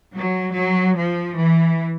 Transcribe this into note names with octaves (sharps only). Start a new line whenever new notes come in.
F#3
F#3
F3
E3